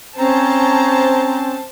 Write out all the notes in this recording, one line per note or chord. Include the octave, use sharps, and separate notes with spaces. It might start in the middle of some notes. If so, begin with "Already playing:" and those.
C4 C#4 C5 A5 A#5